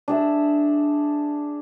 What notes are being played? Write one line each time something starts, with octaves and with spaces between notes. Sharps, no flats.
D4 G#4 E5